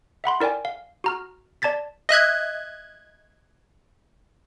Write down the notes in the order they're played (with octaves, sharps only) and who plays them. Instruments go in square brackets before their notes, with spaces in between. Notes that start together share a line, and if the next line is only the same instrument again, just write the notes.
[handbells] E5 F#5 B5 C6
E4 A#4 D5 G5 G#5
F5
F#4 A#5 F6
D5 A5 G#6 A6 B6
[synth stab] D#5 E5 F#6 G#6